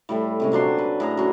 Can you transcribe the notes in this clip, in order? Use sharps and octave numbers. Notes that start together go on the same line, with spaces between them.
A2 G3 A3
C3 G#3 C#4
A#2 F#3 D4 C6
B4
A2 G#4 A#5
F#3 C#4